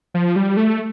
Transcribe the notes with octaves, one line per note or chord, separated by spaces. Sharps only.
F3
G3
A3